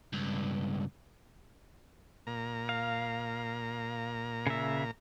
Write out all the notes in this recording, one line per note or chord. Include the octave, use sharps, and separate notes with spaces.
C#2 G2
A#2 A#5
F5
C#3 E5